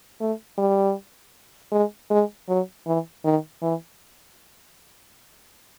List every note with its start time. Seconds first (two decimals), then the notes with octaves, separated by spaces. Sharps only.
0.21 A3
0.58 G3
1.72 G#3
2.10 G#3
2.48 F#3
2.87 E3
3.25 D#3
3.62 E3